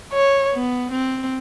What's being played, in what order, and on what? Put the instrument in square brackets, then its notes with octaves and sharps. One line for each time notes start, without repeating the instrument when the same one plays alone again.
[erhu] C#5
[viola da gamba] B3
C4